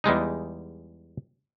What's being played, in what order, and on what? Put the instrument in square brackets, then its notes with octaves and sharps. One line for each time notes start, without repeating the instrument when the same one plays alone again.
[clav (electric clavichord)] E2 G3 G#3 D#4